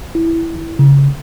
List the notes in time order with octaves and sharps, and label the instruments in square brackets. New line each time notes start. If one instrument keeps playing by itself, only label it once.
[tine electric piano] E4
C#3